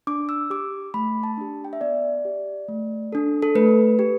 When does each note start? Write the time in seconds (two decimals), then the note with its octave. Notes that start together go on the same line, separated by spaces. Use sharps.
0.07 D4 D6
0.29 E6
0.50 G4 D6
0.94 A3 B5
1.23 A5
1.38 D4 G4
1.65 G5
1.73 E5
1.81 B3 D5
2.25 G4
2.68 A3
3.12 D4 A4
3.42 A4
3.55 A3 B4
3.99 G4